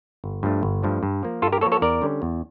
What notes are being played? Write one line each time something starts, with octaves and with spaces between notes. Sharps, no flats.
G1
G2 F3 A3 D4
G1
G2 F3 A3 D4
G2
F3 A#3
G2 F4 A4
G4 A#4
F3 A#3 A4 C#5
A4 C#5
E2 A#4 D5
D3 G3 C#4
E2